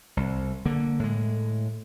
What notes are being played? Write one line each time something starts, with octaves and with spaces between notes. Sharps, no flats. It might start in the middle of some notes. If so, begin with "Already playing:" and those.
C2
D3 A#3
A2 G#3